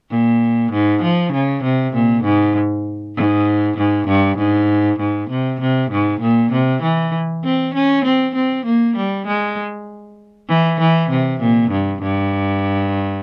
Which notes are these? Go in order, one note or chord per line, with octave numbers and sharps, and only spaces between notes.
A#2
G#2
F3
C#3
C3
A#2
G#2
G#2
G#2
G2
G#2
G#2
C3
C3
G#2
A#2
C3
E3
C4
C#4
C4
C4
A#3
G3
G#3
E3
E3
C3
A#2
G2
G2